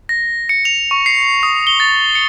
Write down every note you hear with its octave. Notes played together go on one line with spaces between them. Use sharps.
A#6
C#7
F7
C#6
C7
D#6
G7
A6
C#7